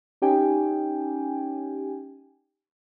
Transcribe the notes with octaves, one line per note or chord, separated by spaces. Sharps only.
C#4 D#4 G4 G5 G#5